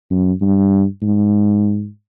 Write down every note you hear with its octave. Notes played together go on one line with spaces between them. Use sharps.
F#2
G2
G#2